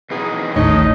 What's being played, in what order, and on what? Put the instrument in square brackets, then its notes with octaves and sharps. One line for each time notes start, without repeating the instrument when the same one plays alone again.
[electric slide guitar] B2 E3 D#4 [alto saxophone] G#4
[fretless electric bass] A1 D#2 A2 [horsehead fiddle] D#4 [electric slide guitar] C#5 A5 [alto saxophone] D#5